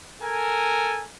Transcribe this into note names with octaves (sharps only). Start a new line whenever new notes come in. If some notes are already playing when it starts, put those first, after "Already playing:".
A4 A#4 G#5